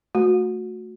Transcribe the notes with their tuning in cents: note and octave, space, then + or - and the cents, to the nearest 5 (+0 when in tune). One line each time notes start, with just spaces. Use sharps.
A3 +0 F#4 -20